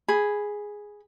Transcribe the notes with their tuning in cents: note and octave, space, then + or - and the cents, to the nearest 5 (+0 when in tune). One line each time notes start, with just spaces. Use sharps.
G#4 +0 B5 +0